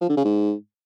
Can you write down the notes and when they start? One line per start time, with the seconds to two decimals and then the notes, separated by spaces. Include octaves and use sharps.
0.01 F3
0.09 D3
0.17 C#3
0.25 G#2